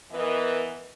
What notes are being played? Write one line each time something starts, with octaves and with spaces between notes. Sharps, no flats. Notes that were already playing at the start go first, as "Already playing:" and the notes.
E3 B3 A#4 B4 D#5